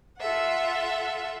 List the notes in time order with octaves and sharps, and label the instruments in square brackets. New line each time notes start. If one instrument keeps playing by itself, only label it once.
[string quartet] F4 A4 E5 F#5